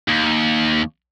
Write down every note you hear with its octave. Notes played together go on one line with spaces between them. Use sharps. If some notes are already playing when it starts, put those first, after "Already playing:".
D#2